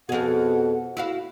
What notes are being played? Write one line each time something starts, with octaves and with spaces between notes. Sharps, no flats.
F2 B2 G#4 F#5
E4 F#4 F5